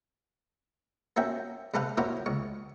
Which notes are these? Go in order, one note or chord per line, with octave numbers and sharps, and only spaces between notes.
A#3 C4 C#4 F#4 E5 G5
C3 C4 A4 B4 C5 F5
A#3 C4 E4 F#4 C5 C#5
C#2 C#6